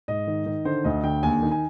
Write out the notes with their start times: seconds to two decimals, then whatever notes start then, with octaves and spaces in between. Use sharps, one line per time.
0.08 G#2 D#5
0.27 D#3
0.46 D#3
0.65 D3 C5
0.84 D2 D#5
1.04 D3 G5
1.23 D#2 G#5
1.42 D#3
1.51 G#5